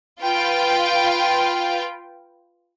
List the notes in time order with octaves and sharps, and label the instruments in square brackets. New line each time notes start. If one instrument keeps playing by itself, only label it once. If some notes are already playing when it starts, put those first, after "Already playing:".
[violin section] F4 B4 G5